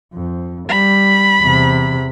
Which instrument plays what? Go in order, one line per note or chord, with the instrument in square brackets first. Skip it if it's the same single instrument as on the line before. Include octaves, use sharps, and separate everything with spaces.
[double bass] F2
[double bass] G3 [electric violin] B5
[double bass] E2 C3